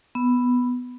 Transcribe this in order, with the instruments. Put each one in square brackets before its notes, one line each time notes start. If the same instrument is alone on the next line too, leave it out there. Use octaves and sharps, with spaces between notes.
[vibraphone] B3